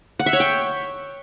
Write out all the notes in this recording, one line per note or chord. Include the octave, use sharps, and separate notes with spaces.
F#5
E5
C#5
G5